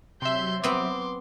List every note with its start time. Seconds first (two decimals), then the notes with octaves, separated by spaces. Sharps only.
0.22 C3 F#3 E5 C6 G6
0.64 B3 C4 C6 D6